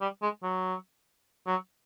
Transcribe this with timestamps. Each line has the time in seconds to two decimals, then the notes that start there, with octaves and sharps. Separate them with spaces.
0.01 G3
0.22 G#3
0.43 F#3
1.47 F#3